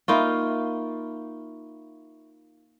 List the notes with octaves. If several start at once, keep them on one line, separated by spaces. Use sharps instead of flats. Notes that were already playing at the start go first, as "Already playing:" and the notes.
A#3 D#4 F4 E5 B5 C#6